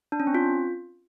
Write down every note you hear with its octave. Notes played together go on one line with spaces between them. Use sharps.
D4
C#4
C4
F4